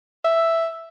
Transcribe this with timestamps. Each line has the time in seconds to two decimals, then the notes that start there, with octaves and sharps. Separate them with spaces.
0.24 E5